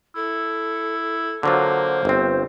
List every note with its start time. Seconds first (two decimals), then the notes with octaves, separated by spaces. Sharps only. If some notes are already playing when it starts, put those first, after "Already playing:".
0.16 E4 A4
1.43 D3 F#3 A#3 F4 C5
2.05 G1 C4